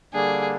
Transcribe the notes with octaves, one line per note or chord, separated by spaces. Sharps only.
D3 G3 A#3 D4 G#4